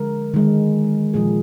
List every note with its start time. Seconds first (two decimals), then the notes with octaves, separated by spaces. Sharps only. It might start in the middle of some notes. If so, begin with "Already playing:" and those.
Already playing: D3 F3 G#3 A#4
0.34 D#3 G#3
1.14 A#2 F3 G#3 G#4